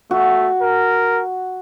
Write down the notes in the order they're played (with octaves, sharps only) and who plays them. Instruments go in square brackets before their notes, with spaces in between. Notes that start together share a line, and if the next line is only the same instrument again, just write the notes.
[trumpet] A3 [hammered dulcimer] F#4
[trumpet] A#4